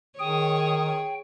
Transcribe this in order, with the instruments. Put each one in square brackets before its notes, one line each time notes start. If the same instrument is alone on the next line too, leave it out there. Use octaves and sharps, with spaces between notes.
[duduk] D#3 [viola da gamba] G#4 C#5 [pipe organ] G5 [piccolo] D#6